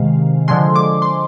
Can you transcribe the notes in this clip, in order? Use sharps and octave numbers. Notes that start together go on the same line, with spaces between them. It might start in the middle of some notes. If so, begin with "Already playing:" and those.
Already playing: C3 D#3 G#3 F5
D3 F3 G#3 C6
D6
C6